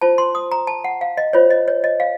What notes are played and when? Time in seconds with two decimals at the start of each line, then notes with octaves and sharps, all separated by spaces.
0.01 F4 C5 A5
0.18 C6
0.35 D#6
0.52 A#5
0.67 A5
0.84 F#5
1.01 F5
1.17 D#5
1.33 F4 C5 C#5
1.50 D#5
1.68 C#5
1.84 D#5
2.00 F5